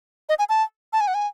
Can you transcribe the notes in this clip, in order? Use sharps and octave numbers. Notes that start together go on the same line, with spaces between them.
D#5
G#5
A5
A5
G#5
F#5
G#5